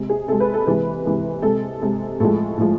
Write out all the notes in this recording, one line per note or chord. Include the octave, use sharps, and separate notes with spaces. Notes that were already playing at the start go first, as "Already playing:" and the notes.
Already playing: C3 G#3
G#4
C3 G#3 A4
B4
A4
C3 E3 G#3 B4
C3 E3 G#3
C3 G#3 A4
C3 G#3
A2 F3 G#3 A4
A2 F3 G#3